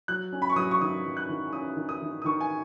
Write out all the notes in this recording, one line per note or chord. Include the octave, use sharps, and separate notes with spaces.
F#3 F#6
C#4
B5
C#6
F#3 D#6
C#6
D#3 D#6
F#3
F#6
D#3
C#4 D#6
D#3
D#6
D#3
D#6
D#3 C#6
G#5